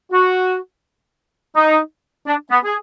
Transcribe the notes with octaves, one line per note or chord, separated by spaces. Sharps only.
F#4
D#4
D4
B3
G#4